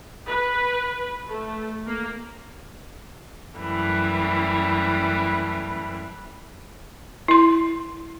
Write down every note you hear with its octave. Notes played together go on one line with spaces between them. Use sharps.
B4
A3
A#3
F#2 E3 G3 A3
E4 C6